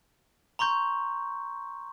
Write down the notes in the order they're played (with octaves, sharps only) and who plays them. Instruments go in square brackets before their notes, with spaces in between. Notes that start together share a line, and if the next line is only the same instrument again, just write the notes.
[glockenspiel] A#5 C6 C#6 G6